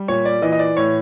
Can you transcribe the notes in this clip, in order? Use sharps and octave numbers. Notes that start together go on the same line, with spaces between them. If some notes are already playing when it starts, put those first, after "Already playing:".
Already playing: G3
A#2 C#5
D5
E3 D#5
D#5
D5
A2 C#5